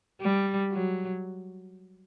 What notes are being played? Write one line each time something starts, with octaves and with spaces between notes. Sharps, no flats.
G3
F#3